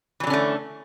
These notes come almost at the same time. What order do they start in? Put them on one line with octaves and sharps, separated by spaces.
E3 F#3 D3 C#4 A3